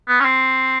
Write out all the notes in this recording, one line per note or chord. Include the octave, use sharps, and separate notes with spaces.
B3
C#4
C4